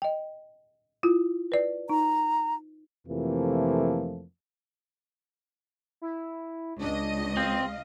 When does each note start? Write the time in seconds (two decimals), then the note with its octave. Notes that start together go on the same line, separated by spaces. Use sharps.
0.02 D#5 G5
1.03 E4 F4
1.52 B4 D5
1.90 D#4 A#5
3.08 F2 C3 E3 F3 A3 A#3
6.01 E4
6.80 C#2 D4 D#5
7.37 C4 F5